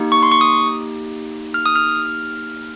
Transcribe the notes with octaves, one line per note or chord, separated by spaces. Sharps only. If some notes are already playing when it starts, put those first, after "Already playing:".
Already playing: A#3 D#4 G4
C#6
C6
C#6
D#6
F6
D#6
F6